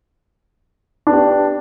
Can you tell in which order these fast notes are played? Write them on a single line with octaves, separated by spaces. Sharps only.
D4 B3 G4